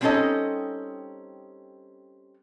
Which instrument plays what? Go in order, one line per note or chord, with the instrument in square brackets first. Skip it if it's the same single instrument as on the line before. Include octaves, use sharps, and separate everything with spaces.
[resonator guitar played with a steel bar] G3 C4 C#4 D#4 A4 D#5